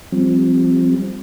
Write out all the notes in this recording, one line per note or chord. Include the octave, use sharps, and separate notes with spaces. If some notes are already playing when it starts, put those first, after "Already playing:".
F3 G3 C4